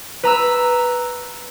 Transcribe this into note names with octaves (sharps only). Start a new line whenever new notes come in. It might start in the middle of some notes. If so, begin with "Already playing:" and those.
B4 A#5 E6